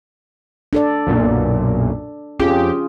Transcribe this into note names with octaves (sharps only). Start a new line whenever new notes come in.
D4 A4 D5
B1 F#2 A#2
F2 C#4 F4 G4 G#4